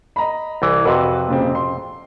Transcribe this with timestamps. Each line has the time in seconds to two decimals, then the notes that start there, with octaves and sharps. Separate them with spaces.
0.16 D#5 A#5 B5
0.62 C2 E3
0.85 F2 C3 F#4 B4
1.28 A#2 C#3 C4
1.55 C6